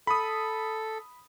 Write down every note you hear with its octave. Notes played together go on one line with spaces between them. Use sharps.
A4 B5 D#6